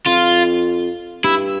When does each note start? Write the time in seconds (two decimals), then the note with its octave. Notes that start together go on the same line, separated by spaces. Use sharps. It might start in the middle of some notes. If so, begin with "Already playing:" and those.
0.06 F2 F4
1.24 G2 E4